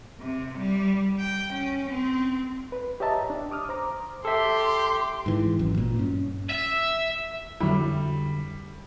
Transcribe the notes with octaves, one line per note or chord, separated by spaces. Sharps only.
C3
G3
G5
C#4
C4
B4
G4 C#5 D#5 E5 A5 A#5
D4
D6 D#6 F6
C5 A#5 D6
G4 A4 E5 C6
G#2 E3
G#1 F#2
A#2
G2 C#4
E5
F2 D3 F#3 G3 E4